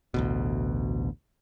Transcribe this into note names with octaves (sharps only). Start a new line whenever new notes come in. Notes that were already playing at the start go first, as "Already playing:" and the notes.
A1 D2 B2